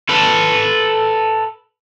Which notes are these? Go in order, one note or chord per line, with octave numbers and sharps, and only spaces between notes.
A4 B4